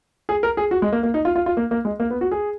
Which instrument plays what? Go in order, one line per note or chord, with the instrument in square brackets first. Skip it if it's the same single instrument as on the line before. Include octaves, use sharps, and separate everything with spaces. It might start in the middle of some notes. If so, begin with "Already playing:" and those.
[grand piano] G#4
A#4
G#4
F#4
G#3
A#3
A#3
D#4
F4
F4
F4
A#3
A#3
G#3
A#3
B3
F#4
G#4